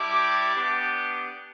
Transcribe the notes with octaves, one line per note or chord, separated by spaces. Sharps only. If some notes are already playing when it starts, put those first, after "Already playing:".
Already playing: G3 E4 G4 A5 D6
B3 D4 G4